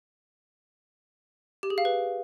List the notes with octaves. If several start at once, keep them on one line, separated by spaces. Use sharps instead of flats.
G4
G#4
F5
B4